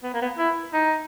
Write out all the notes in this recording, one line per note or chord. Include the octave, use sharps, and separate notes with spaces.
B3
A#3
B3
E4
D#4